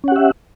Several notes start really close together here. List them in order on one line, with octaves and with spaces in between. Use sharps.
C#4 F#5 G4 E5